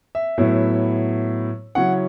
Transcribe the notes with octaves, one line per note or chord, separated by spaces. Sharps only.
E5
A2 F#3 B3 E4
C#3 F#3 C#4 E4 F#5